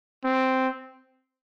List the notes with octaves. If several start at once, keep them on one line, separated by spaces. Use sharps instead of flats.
C4